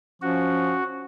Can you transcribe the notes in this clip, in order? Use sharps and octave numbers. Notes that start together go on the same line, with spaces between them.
F3 C#4 F#4